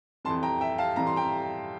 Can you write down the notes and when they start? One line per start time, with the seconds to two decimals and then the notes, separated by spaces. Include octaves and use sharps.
0.25 F2 E3 G3 A5 C6
0.43 G5 A#5
0.61 E5 G5
0.78 F5 A5
0.96 F2 E3 G3 A#5
1.07 C6
1.16 G5 A#5